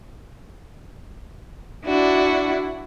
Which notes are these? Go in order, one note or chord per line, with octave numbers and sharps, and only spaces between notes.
D4 E4 F#4 D5